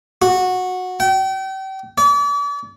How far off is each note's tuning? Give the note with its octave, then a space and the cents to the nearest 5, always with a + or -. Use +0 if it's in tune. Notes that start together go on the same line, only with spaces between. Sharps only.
F#4 -15
G5 -35
D5 -40